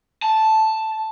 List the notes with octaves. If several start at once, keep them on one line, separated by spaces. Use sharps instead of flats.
A5